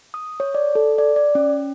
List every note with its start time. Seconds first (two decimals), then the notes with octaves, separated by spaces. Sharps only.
0.14 D#6
0.40 C#5
0.55 D5
0.75 A4
0.98 D5
1.16 D5
1.35 C#4